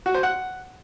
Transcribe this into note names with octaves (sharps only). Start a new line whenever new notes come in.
F#4
C5
F#5